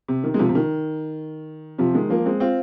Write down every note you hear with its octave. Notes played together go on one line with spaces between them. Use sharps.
C3
D#3
G#3
C3 F3
C3
D#3
C3 F3
D#3 G#3
F3 A#3
G#3 C4
C4 F4